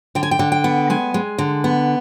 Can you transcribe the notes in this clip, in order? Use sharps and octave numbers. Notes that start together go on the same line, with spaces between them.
D3 G5
G#5
G5
D3
G5
B3
G#3 G#5
G#3
D3
B3